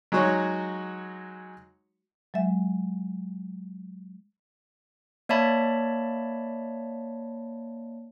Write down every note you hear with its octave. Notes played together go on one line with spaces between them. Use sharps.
F#3 G#3 D#4 F#4 C#5
F#3 G#3 E5
A#3 C#5 D5 E5 A5 B5